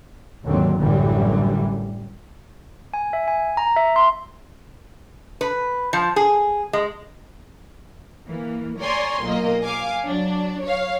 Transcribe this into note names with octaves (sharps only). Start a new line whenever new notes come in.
D#2 G#2 D3 F#3 C4
A1 F#2 D3 E3 G3
G#5
E5
G#5
A#5
E5
C6
B4
F3
G#4
G#3
E3 A#3
C#5 D5 G#5 A#5 C6
B1 A#2 A#3 D#5
F5 G#5 D6
F#3 D4
C#5 F5